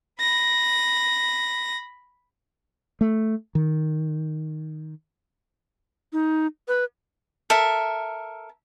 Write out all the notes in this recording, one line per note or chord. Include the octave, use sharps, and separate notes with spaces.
B5 A#6
A3
D#3
D#4
B4
A4 A#4 E5